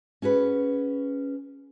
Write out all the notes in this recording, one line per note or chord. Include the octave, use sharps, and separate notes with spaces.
C#4 F#4 G#4 B4